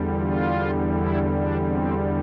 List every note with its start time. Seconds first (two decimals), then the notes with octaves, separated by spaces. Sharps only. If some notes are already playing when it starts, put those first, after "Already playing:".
Already playing: E2 D3 G3
0.18 F4
0.92 E4
1.31 D4
1.68 C4